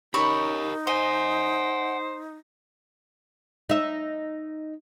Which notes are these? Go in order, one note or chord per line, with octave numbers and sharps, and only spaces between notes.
C#4 D#4 G4 A#4 B5 C#6
C5 D#5 F#5 G#5
D#4 E5